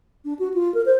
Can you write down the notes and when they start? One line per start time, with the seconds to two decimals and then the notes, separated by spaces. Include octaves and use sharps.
0.25 D4
0.39 F#4
0.54 F4
0.74 A#4
0.86 C5